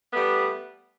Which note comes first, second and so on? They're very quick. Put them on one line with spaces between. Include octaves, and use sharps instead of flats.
A3 B3 G3